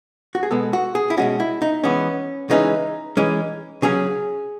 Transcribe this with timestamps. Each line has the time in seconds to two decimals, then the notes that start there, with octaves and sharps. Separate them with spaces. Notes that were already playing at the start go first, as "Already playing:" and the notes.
0.35 F#4
0.43 G#4
0.51 B2 G#3 B3 A4
0.73 F#4
0.95 G#4
1.10 E4
1.17 B2 G#3 C#4 F#4
1.40 E4
1.62 D#4
1.84 E3 G#3 B3 C#4
2.50 C#3 E3 G#3 C#4 D#4
3.17 E3 G#3 C#4
3.82 C#3 F#3 C#4 G#4